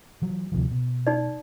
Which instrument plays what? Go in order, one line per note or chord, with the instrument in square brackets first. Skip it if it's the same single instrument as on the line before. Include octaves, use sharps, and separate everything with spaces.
[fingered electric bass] E3 F#3
D2 C3 F3
B2
[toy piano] D#4 D5